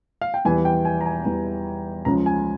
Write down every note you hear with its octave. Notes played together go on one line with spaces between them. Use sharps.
F5
G5
E2 E3 G3 G#5
G5
G#5
A#5
G#5
E2 E3 G3
C#2 C#3 F3 A#5
G#5